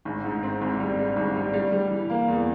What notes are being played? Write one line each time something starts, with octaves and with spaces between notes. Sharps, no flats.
G#1
G#2
C4
G#1
G3
G3
G#1
G3
G3
G3
E3
A#3
E2